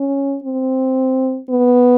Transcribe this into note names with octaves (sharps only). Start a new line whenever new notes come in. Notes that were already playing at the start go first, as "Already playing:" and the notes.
Already playing: C#4
C4
B3